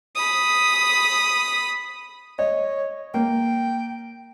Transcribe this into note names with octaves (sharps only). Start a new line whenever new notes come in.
B5 D#6
C#5 D#5
A#3 G5